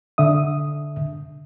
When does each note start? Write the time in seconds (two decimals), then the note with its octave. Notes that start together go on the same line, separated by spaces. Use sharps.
0.18 D3 E5 D#6